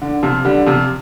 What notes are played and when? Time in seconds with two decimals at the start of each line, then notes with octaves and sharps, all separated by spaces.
0.02 D3
0.23 C3 F3
0.45 D3 G3
0.66 C3 F3